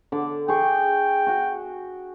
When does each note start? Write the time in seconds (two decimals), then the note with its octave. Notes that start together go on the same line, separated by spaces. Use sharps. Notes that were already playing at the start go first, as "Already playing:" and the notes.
0.12 D3 D6
0.48 G#4 G5 C#6
1.27 F#4 F#5